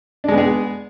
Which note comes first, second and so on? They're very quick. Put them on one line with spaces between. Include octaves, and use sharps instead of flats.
D4 G#3 B3 G#4